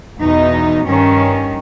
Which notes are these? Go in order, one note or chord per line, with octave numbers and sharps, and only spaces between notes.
E2 B2 D#4
G2 D#3 C#4